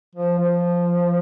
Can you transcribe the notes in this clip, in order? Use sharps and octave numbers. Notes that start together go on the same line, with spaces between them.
F3
F3